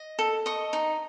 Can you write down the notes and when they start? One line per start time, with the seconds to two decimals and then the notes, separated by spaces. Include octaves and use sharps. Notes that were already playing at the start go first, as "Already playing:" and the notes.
Already playing: D#5
0.19 A4
0.46 D#5 C#6
0.73 D#4